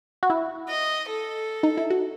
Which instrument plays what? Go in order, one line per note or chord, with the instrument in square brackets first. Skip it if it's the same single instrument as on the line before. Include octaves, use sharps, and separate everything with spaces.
[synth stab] F#4
E4
[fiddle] D#5
A4
[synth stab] D#4
E4
F#4